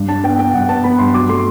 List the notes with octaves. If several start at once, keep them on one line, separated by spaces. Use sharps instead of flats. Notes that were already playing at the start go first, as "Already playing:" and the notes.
Already playing: G2
D4 A5
B3 G5
B3 G5
G2 F#5
B3 A5
B3 B5
G2 C6
F#3 D6
A3 C6